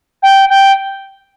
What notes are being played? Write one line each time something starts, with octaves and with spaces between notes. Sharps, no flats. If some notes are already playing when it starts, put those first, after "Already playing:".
G5
G5